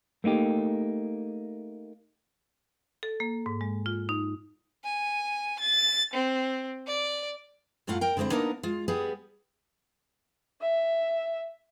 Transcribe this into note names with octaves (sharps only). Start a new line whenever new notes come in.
A3 A#3 D#4 G4
A4
A#3
G#2
G#3
F4
D#4
G#5
A6
C4
D5
F#2 A2 A3 F4 F5 F#5
A#4 G5
D3 G#3 A#3 C4 E4
A#3 B3 D4 D#4 A#4
G#3 F4
G3 B3 G#4
E5